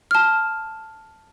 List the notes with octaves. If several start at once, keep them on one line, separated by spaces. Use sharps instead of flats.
A5 F6